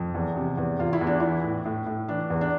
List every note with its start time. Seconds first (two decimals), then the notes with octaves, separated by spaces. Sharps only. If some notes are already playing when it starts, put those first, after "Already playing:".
Already playing: F2
0.14 E2
0.37 C3
0.58 E2
0.79 E2 F4
0.93 E4
1.01 E2
1.07 D4
1.20 E3 E4
1.44 A2
1.65 A2
1.86 A2
2.08 E3 D4
2.30 E2
2.41 D4